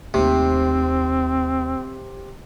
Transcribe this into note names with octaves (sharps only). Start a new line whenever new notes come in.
D#2 C3 A3 C4